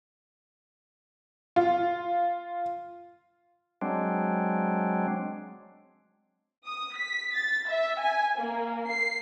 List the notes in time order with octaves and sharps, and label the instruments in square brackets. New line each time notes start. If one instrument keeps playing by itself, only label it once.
[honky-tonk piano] F4
[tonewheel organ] F#3 G#3 C4 D4
[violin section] D#6
B6
A6
E5
G#5
A#3
C7